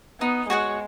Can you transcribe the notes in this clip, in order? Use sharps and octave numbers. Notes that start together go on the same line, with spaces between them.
B3 D#4
G#3 F#4 C#5 F#5